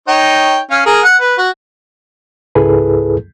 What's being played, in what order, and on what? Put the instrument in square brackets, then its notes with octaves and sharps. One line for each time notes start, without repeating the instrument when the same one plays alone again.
[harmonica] D#4 C#5 G5
C#4 F5
G#4 A#4
F#5
B4
F#4
[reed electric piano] C#2 G#2 E4 G#4 A4 B4